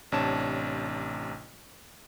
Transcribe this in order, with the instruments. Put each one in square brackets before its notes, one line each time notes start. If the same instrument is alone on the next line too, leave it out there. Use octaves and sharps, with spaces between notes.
[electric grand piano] A1 C3 D4 C#5 A5 E7